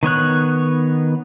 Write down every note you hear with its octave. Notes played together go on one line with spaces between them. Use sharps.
D#3 B3 C#5 F#6